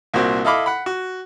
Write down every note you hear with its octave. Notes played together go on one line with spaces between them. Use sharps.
C2 A#2 C4 F#4 C5
E4 A4 D#5 F5 B5 D6
F#5 B5
F#4